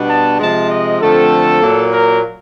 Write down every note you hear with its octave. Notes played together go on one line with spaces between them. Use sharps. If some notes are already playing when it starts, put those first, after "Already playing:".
Already playing: B2 G3 B3 D4
A5
C3 F3 G#3 A5
D#5
D3 F3 A3 C4 A4
A#2 F#3 A#3
A#4